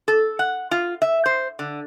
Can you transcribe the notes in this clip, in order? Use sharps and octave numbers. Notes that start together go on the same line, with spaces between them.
A4
F#5
F4
E5
C5
D3